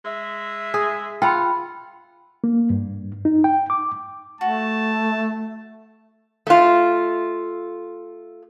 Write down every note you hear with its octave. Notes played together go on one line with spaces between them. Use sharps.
G#3 E5
G#4
F4 F#5 G5 B5
A#3
G2
D#4
G5
D6
A3 F#4 A5
A3 F4